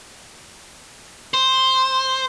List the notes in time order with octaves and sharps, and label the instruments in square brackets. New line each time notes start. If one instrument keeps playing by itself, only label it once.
[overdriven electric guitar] C5